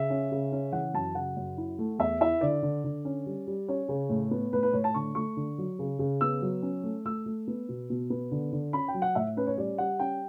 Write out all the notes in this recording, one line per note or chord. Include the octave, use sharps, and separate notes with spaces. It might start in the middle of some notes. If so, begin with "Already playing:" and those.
Already playing: C#3 E5
C#4
C#3
C#4
E3 F#5
F#2 A5
C#3 F#5
F#2
E4
A3
E2 E5
E4 E5
D3 D5
D3
D3
C#4
G3
G3
C#4 C#5
C#3
A2
B3
A2 B4
B4
A2 C#5
A5
D3 C#6
A3 C#6
D3
F#3
C#3
C#3
B3 E6
F#3
C#4
A3
A3 E6
A3
B3
B2
B2
B3
D3
D3
C#4 B5
G5
F#3
F#5
A2 E5
C#4 B4
C#5
G3 D5
G3 F#5
C#4 G5